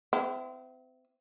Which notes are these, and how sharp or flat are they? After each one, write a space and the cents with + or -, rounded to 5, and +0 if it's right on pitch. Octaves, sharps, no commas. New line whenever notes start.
C4 -35 E4 +20